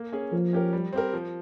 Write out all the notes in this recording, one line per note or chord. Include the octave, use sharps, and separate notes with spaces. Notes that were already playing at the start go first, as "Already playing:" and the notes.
Already playing: A#3
C#4 G#4
F3 A#3
C#4 G4 A#4
G3
C4 G4 A#4
F3